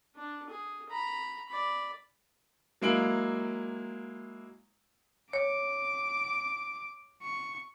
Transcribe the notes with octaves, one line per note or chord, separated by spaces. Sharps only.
D4
G#4
A#5 B5
D5 B5
F#3 G#3 A#3 E4 D7 F#7
C#5 D6
C#6